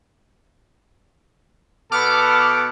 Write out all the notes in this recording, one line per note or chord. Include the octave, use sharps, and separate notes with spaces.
B2 B3 A4 D6 F6